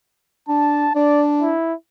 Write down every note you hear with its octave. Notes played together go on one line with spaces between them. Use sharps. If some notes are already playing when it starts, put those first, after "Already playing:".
D4 A5
D4 D5
E4